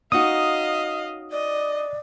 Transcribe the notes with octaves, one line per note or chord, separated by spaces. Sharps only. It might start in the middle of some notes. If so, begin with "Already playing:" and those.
C#4 D#4 F#4 D#5 F5 D#6
D5 D#5